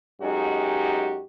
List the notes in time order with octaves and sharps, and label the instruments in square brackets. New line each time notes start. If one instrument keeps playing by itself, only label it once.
[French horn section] F#2 G#3 D#4 F#4 G4